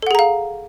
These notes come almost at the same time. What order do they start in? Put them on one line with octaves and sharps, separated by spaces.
A4 F#5 G#4 A#5 F5